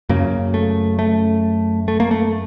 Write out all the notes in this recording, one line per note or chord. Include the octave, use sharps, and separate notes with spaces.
F#2 C#3 A#3
A3
A3
A3
A#3
A3